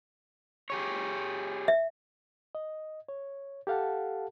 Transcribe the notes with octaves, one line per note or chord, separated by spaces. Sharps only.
G4 G#4 C#5
E5
D#5
C#5
G4 A4 F5 F#5 A5